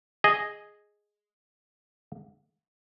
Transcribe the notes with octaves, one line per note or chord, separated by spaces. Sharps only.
G#4 D#5